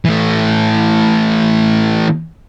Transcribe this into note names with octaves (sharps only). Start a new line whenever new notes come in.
E3 A3